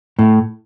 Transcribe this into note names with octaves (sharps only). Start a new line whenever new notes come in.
A2